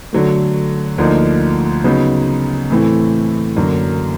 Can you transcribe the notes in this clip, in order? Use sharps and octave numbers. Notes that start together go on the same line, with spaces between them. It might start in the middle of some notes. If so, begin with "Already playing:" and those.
D3 F#3 A3
D2 D3 F3 A#3 D#4
C#3 F#3 B3 D#4
A2 E3 A3 C4
F#2 D3 F#3 A#3